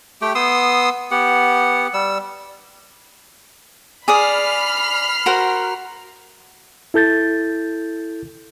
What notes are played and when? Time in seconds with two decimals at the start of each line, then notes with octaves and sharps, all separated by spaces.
0.22 A3 G4 G5
0.35 B3 C6 D#6 E6
1.11 B3 G4 F#5
1.94 G3 E6
4.08 G#4 D5 B5 D#6 F6 C7
5.26 F#4 A#4 C5
6.94 E4 A4 G6 A6